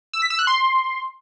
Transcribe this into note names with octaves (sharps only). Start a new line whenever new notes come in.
E6
B6
E6
F#6
C6